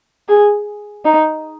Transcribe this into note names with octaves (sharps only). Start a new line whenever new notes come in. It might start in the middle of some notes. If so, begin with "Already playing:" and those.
G#4
D#4